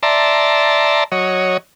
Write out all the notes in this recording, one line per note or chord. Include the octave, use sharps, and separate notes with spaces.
D5 E5 A5 A#5 C6
F#3 C#5 D#5